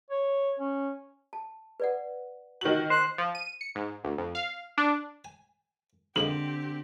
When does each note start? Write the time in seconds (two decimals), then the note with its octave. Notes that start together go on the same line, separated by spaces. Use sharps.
0.11 C#5
0.60 C#4
1.33 A5
1.80 B4 D5 F#5
2.61 D#3 F#4 F#7
2.90 C5 F#6
3.18 F3
3.35 D#7
3.61 C#7
3.75 G#2
4.04 D2
4.18 F2
4.35 F5
4.78 D4
5.25 G#5
6.16 F2 D3 G#3 A#3 C4 G4 F#7